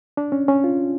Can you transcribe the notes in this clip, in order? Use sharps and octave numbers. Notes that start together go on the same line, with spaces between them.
D4
C#4
C#4
F4